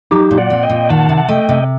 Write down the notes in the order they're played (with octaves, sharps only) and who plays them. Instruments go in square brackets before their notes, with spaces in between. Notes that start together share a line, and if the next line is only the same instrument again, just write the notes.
[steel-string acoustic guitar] F#3 [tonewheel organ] D#4 G4
[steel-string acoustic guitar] A#2
[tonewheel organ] D5 F#5
[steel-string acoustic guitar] C4
[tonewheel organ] D#5 G5
[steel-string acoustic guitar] A#2
[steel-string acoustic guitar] D#3 [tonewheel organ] F#5 A5
[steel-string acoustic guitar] C3
[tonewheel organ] F#5
[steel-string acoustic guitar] A3 [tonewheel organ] D#5 G5
[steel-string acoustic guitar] C3